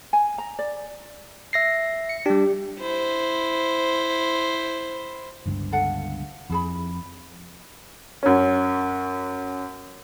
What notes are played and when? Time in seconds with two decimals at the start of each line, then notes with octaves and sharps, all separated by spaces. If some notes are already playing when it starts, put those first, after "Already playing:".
0.13 G#5
0.38 A#5
0.59 D5
1.53 E5 A#6 C7
2.09 C#7
2.26 G3 D4 G4
2.80 E4 C5
5.46 G1 C#2 G2
5.72 A4 F5 F#5
6.50 F2 E4 G#4 B5
8.23 F#2 C#4